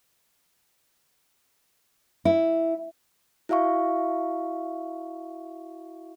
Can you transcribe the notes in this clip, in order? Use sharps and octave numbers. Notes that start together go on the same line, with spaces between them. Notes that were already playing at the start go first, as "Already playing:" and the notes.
E4
E4 F#4 E5 F5 C#6